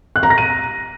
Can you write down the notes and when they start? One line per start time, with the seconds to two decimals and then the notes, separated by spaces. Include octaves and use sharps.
0.16 F#6
0.23 A#5
0.30 A#6
0.38 D#7